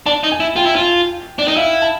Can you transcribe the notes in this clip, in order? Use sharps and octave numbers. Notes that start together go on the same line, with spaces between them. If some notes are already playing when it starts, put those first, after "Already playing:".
D4 A5
D#4
G#5
E4
F4 G5
E4
F4
D4
D#4
E4 F5
A5